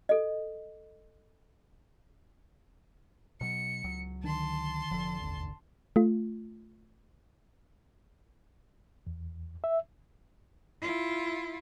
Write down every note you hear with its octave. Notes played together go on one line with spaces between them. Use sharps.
A4 D#5
B2 F#3 C#7
C#2 F#3
D3 D#3 D4 A5 C6
F1 D3 F3
G#1 D#2
A3 F4
E2
E5
E4 F4